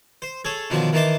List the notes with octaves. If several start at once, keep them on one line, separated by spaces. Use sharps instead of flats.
C5
G#4 A4 C#5
B2 D3 D#3 F3 F#3 D4
D#3 E3 D#4 A5 C6 D6